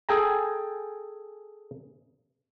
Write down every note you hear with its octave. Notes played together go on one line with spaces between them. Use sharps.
G#4 A4 G5 G#5 A#5